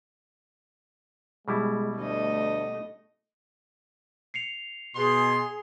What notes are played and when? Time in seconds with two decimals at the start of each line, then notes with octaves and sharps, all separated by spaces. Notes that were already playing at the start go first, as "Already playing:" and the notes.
1.48 B2 G3 G#3 E4
1.97 D2 A3 D#5
4.34 C7 C#7 F7
4.96 B2 G#4 C6